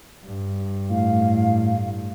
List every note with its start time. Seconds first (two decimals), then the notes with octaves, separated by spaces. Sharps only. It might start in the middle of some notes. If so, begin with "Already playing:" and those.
0.25 G2
0.90 A2 F5